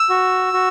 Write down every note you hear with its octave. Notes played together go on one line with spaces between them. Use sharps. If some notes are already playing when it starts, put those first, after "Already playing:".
Already playing: E6
F#4
F#4